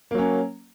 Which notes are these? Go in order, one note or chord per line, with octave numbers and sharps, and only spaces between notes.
F#3 A#3 C#4